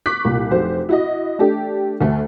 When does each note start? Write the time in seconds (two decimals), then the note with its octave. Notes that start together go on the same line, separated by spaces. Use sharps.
0.06 C#6 D6 F#6 B6
0.25 C2 A#2
0.51 F1 F#3 C5
0.89 E4 F#4 D#5
1.39 A3 D4 G4 A4
2.01 D2 A3